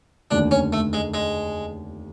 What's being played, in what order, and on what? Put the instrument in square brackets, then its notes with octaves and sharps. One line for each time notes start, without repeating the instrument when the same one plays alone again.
[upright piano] F1 D#2 D3 [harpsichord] D4
[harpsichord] C#4
A3
G#3
G#3